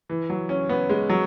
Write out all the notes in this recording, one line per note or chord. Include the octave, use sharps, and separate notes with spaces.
E3
F#3
C#4
B3
G#3
F#3